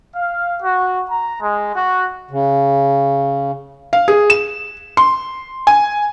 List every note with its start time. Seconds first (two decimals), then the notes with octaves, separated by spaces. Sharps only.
0.14 F5
0.62 F#4
1.10 A#5
1.41 G#3
1.76 F#4
2.31 C#3
3.93 F5
4.08 G#4
4.30 E7
4.97 C6
5.67 G#5